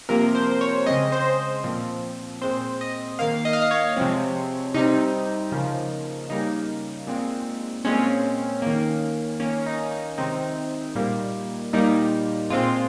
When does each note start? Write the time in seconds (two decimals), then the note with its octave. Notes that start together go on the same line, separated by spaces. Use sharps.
0.09 C3 F3 A#3 A#4
0.35 C5
0.61 C#5
0.86 C#3 G#3 C4 D#5
1.12 C5
1.64 A#2 F3 C4
2.42 A#2 G#3 C4 C5
2.81 D#5
3.19 D#3 A#3 F5
3.45 D#5
3.53 F5
3.61 D#5
3.71 C#5
3.97 C3 F3 G#3 C4
4.74 C3 G3 C4 D#4
5.52 C#3 F3 A#3
6.30 C#3 G3 A#3 D#4
7.07 A#2 G#3 C4
7.85 A#2 G#3 C4 C#4
8.62 D#3 A#3
9.40 D#3 A#3 C#4
9.66 D#4
9.91 D#4
10.18 C3 D#3 G#3 C4 D#4
10.95 A#2 G3 A#3
11.73 A#2 G3 A#3 D#4
12.50 A#2 G#3 C4 F4